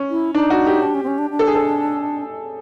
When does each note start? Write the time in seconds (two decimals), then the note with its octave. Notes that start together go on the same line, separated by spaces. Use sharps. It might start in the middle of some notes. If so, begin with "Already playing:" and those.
Already playing: C#4
0.10 E4
0.34 D4 D#4
0.50 F#4
0.67 G4
0.83 D4
0.95 C#4
1.03 C4
1.07 C#4
1.18 D4
1.31 D4
1.39 A4
1.47 G#4
1.55 A4